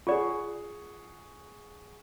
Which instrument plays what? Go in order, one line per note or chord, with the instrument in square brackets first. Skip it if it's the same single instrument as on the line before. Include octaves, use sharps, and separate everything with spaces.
[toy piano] F4 D5 [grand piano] G#4 F#5 C#6